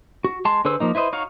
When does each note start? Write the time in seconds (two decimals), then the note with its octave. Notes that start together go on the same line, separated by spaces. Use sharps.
0.24 F#4
0.45 G#3 A5 C6
0.65 D3 G#4 B4 C5 E6
0.80 F3 A#3 D#4
0.95 E4 B4 C5 D#5
1.13 D#4 F#4 C#5 F5